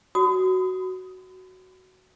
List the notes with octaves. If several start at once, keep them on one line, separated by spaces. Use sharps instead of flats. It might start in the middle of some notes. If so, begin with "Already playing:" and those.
F#4 D#6